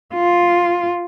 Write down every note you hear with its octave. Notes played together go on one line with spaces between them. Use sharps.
F4